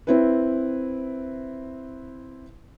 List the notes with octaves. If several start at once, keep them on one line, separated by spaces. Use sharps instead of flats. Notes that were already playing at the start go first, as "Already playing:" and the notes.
C4 E4 B4